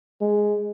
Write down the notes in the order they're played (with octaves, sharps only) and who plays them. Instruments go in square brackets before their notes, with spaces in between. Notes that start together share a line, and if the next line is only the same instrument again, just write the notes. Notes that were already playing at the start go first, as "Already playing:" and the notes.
[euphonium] G#3